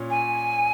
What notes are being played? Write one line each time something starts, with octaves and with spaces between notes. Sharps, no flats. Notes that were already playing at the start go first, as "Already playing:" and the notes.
Already playing: A#2 C#4
G#5